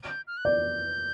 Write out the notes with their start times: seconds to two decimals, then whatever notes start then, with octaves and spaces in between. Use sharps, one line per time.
0.09 G6
0.27 F6
0.37 F#6
0.45 D5 G6